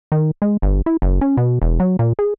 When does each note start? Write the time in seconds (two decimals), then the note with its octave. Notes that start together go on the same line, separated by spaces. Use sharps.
0.12 D#3
0.42 G#3
0.62 G1
0.86 E4
1.02 F#1
1.21 C#4
1.37 B2
1.62 E1
1.80 F#3
1.99 A#2
2.19 G#4